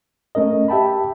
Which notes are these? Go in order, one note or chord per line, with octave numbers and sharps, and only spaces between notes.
A3 C#4 A#4 D#5
G4 E5 G5 A5 B5